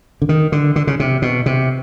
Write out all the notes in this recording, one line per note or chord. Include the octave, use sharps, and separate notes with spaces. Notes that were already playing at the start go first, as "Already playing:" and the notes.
D3
D#3
D3
D3
C#3
C3
B2
C3